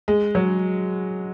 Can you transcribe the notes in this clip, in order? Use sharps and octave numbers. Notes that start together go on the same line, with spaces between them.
G#3
F#3